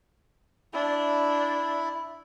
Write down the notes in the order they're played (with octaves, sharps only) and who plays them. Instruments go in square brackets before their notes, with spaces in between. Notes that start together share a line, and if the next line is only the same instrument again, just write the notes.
[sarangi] D4 [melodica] E4